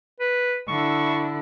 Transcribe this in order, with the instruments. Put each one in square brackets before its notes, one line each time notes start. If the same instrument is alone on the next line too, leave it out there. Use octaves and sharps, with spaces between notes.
[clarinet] B4
[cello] D3 E4 [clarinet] C#6